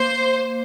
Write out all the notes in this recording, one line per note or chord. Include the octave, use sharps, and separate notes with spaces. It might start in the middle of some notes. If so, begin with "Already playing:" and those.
Already playing: A#3 C5